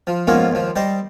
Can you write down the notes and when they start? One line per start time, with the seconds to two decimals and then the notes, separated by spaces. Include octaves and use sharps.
0.07 F3
0.27 G#2 F3 A#3 B3 C#4 F4
0.51 D#2 F3
0.76 G3 C5 D#5